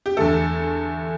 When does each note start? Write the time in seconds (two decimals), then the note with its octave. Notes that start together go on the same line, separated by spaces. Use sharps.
0.06 G4
0.17 E2 D3 A3 A4